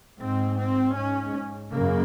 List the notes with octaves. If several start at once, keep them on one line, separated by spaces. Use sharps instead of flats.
G#2 C4
C4
G#2 C#4
F#2 C#3 A#3